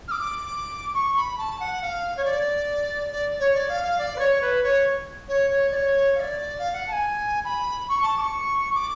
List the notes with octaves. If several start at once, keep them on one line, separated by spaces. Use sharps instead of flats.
F6
D6
C#6
B5
A5
F#5
F5
C#5
D5
D5
C#5
D5
F5
F5
D5
B4
C#5
B4
C#5
C#5
C#5
D5
C#5
F5
D5
F5
F#5
A5
G#5
B5
C#6
A5
D6
C#6
D6